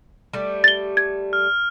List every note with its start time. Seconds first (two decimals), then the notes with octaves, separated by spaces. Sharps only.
0.33 G3 A3
0.64 A6 G7
0.97 G#6
1.33 F6